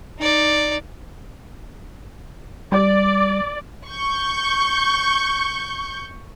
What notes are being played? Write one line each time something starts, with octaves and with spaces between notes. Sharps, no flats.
D#4 D5
G3 D5
C#6 G6